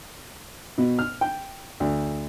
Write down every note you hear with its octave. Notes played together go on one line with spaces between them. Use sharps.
B2
F6
G5
D2